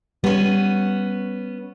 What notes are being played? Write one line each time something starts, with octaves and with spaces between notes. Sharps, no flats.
G3 B3 C#4